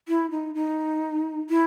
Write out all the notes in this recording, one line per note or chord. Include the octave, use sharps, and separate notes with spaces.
E4
D#4
D#4
E4